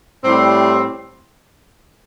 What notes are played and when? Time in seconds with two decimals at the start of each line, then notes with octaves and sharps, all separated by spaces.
0.25 A2 G3 C4